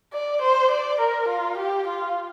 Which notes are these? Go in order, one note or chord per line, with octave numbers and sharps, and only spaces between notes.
D5
C5
D5
A#4
F4
G4
F4